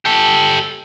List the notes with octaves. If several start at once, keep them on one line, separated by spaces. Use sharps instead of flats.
G4 A4